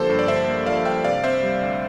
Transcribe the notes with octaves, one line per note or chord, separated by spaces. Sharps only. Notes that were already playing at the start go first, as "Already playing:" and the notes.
Already playing: D3 F3 A#3 G4 A4 C5
G2
D5
D3 C5 E5
A#3
F3 D5 F5
G2 E5 G5
C3 D5 F5
C4 C5 E5
G3
D2